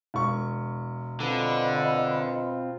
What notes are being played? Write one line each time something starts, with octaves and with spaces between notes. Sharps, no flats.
E1 C#6
D3 C4 F4 B4 D#5 B5